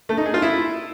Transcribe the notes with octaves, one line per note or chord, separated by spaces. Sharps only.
A3
D#4
G#4
F4
E4